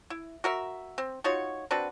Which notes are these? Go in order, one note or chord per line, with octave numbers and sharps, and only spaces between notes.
E4
F#4 A#4 E5
C4
D#4 F4 F#4 C#5
C4 D4 F#4 B4